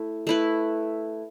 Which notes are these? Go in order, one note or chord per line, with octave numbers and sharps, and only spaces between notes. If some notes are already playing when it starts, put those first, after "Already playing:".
Already playing: A3 E4
A3 E4 B4